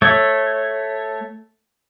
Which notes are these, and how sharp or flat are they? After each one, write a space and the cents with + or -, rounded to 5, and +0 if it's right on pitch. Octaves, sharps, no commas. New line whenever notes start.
A3 +0 C#5 -15